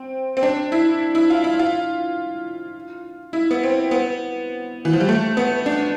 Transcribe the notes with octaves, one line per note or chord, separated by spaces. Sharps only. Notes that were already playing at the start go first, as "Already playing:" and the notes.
Already playing: C4
C4
D4
E4
E4
F4
E4
F4
E4
B3
C4
B3
E3
F3
G3
A3
B3
D4